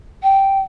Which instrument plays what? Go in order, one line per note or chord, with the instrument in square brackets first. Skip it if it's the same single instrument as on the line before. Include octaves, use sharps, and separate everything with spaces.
[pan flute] G5